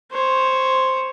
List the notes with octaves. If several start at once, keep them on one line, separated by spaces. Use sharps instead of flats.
C5 C#5